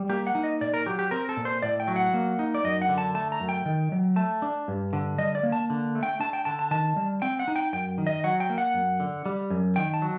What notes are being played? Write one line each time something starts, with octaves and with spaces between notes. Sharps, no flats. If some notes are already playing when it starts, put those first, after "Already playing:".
Already playing: G3
A#3 G4
F#5
D#4
D#5
A#2 D5
A#4
F#3 G4
G4
C4 A#4
A4
A#2
C5
A2 D5
G5
F#3
F#5
A#3
D#4
D5
F#2 D#5
F#5
D3
A5
A3 A5
A#5
F#2
G5
D#3
F#3
A3 A5
D4
G2
D3
G3 D#5
D5
A#3
A5
D3
A3
G5
D4 A5
G5
D3 A5
A5
D#3 A5
G3
C4 G5
F#5
D#4
G5
F#2 G5
D#3
D#5
F#3 F#5
G5
A#3
F#5
F#2
D3
G3
F#2
D#3 G5
A5
F#3